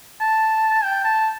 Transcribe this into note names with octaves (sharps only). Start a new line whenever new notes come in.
A5
G5
A5